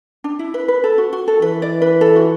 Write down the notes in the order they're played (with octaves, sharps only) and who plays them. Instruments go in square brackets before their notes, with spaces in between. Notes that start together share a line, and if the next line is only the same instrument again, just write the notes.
[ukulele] D4
E4
B4
B4
A4
F#4
F#4
A4
[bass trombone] E3 [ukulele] B4
[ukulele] D5
B4
A4
F#4